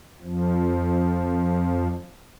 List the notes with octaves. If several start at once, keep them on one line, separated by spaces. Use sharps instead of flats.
F2 F3